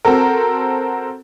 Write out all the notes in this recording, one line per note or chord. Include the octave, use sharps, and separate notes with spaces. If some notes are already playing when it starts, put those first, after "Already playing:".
C4 F#4 A4 A#4